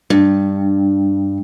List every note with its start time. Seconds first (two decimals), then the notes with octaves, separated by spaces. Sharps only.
0.10 G2